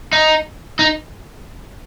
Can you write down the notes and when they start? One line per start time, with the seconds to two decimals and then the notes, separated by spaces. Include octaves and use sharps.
0.13 D#4
0.79 D#4